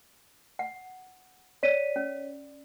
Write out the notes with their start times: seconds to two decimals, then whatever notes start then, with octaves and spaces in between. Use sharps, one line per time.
0.59 F#5
1.63 C#5 D5 B6 D#7
1.96 C#4